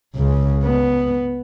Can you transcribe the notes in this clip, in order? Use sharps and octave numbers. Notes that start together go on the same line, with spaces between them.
C#2 C#3
B3